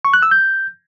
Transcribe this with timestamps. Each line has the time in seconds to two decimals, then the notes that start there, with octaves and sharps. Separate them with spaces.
0.05 C#6
0.14 F#6
0.22 E6
0.31 G6